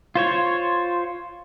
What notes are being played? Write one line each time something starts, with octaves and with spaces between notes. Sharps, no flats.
F4 C5 C#5